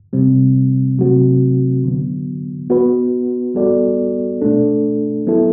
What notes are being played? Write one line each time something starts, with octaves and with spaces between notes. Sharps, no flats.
C3 G3 C4
C3 F#3 A3 C4 F#4
D3 F#3 B3
B3 F#4 B4
G3 B3 F#4 A4 D5
B2 A3 D4 A4
F#3 B3 E4 A4